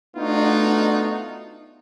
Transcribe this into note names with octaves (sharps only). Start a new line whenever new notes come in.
A3 B3 D4 D#4 F4 F#4